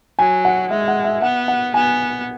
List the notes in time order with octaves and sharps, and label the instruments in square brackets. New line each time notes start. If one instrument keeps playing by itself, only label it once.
[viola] F#3 [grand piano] G#5
[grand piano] F#5
[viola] G#3 [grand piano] E5
[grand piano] F#5
E5
[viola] B3 [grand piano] F#5
[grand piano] F#5
[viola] B3 [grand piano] G#5